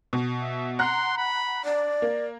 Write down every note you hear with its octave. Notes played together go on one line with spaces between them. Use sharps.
B2
E5
F#5 A#5 C6 F#6
B5
D4 D5
A#3